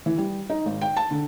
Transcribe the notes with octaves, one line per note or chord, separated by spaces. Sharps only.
E3
G3
D#4
G#1
G5
A5
D3